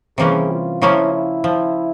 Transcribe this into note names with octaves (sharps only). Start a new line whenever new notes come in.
C3 E3 G3 A#3 C#4 G#4
F4
C#3 F3 A#3 C#4 E4
E4
F3